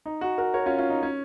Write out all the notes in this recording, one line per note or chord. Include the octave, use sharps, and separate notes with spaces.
D#4
D#4 F#4
F#4 A#4
A#4 C#5
C#4 F4
C#4 F4
D#4
C#4